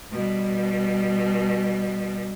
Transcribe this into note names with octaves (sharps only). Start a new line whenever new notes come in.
B2 G3